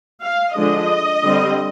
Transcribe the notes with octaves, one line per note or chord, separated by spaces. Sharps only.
F5
D3 F3 G#3 D4 D#5
D3 G3 C4